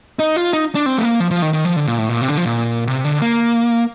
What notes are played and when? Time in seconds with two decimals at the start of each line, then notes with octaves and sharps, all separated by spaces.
0.19 D#4
0.36 F4
0.53 D#4
0.75 D4
0.86 C4
0.98 A3
1.03 A#3
1.20 F3
1.31 F3
1.42 D#3
1.53 D#3
1.65 F3
1.76 D3
1.87 A#2
1.98 A2
2.09 A#2
2.21 C3
2.28 D3
2.37 F3
2.45 A#2
2.87 C3
3.04 D3
3.21 A#3